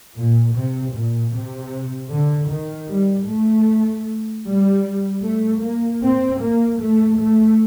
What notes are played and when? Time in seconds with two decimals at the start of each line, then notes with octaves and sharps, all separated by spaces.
0.16 A#2
0.55 C3
0.94 A#2
1.33 C3
2.10 D3
2.49 D#3
2.89 G3
3.28 A3
4.44 G3
5.23 A3
5.61 A#3
6.01 C4
6.40 A#3
6.79 A3
7.17 A3